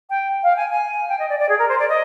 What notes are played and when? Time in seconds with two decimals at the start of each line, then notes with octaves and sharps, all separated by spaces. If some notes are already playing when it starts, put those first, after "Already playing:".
0.10 G5
0.43 F5
0.56 G#5
0.69 G#5
1.09 G5
1.19 D#5
1.29 D5
1.39 D5
1.49 G#4
1.58 A#4
1.68 C5
1.79 D5
1.89 D#5